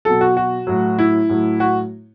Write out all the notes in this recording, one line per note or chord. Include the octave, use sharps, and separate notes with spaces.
B2 F#3 A4
F#4
F#4
A2 F#3
E4
A2 F#3
F#4